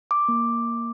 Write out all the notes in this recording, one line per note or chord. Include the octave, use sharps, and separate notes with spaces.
D6
A#3